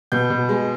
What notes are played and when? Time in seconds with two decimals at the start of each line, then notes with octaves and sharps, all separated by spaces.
0.12 B2 G6
0.30 B2
0.49 G#3